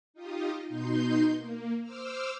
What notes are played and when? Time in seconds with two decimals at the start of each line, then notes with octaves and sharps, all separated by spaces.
0.14 D#4 F4 G4 D#5
0.68 B2 D#4 C6 G6
1.37 A#3
1.82 C5 D6 E6 F6